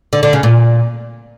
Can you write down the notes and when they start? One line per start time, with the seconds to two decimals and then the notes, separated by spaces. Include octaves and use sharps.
0.13 D3
0.23 D3
0.33 C#3
0.43 A#2